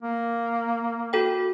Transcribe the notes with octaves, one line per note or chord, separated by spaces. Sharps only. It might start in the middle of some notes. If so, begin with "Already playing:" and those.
A#3
F#4 A4 G5